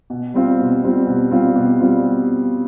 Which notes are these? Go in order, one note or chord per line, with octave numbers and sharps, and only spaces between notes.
B2
G3 C4 F4
B2
G3 C4 F4
B2
G3 C4 F4
B2
G3 C4 F4